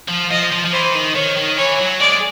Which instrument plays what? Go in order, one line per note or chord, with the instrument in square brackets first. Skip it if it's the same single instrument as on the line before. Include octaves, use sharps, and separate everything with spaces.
[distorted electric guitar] F3
[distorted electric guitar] F3 [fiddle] D#5
[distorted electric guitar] F3
F3
[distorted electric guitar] E3 [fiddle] C5
[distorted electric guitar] D#3
[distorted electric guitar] D#3 [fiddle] C#5
[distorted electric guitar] D#3
[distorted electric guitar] E3 [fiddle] C#5
[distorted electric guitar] F#3
[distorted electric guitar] G#3 [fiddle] D5